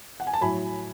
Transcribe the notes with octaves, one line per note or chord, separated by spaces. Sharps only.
F#5
G#5
A5
A2 F#3 G#5 B5